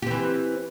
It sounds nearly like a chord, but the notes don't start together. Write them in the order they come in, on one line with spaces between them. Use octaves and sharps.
G4 C4 E3